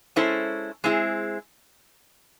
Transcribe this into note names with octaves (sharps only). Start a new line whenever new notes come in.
G#3 C#4 E4 A4 C5
G#3 C4 E4 G#4